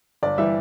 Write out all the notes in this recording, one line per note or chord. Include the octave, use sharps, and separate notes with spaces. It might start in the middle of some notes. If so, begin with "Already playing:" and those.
G1 D5
E3 G3 E5